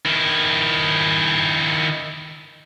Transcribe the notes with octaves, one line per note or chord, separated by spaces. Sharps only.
D#3 E4